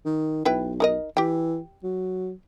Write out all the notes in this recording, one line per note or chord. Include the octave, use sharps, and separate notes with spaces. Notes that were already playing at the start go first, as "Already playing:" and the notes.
D#3
B1 E4 B4 G5
D#4 A#4 D#5
E3 G4 G5
F#3